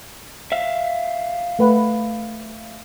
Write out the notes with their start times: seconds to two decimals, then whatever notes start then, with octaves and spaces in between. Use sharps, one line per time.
0.52 E5 F5
1.59 A3 B4 F#5